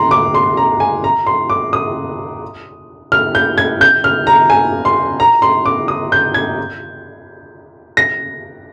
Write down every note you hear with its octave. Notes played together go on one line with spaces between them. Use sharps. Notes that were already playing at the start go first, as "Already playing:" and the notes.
Already playing: A#5 C6
D6
C6
A#5
G#5
A#5
C6
D6
D#6
F6
G6
G#6
G6
F6
A#5
G#5
C6
A#5
C6
D6
D#6
G6
G#6
A#6